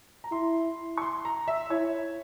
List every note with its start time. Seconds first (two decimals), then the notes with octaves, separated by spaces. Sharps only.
0.24 A#5
0.32 E4 C6
0.98 C#6
1.02 C6
1.25 A#5
1.48 E5
1.70 E4 C#5